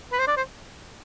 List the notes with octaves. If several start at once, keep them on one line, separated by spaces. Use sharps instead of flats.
B4
C5
D5
C5